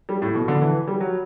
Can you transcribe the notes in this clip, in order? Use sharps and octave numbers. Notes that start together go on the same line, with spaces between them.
G3
A2
B2
D3
E3
G3
F#3